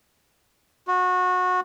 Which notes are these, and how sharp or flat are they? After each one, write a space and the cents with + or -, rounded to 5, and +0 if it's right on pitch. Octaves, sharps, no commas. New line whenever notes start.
F#4 -25